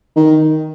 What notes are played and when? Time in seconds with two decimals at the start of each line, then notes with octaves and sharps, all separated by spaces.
0.16 D#3